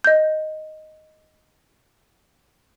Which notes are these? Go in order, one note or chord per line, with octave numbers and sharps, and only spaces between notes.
D#5 G6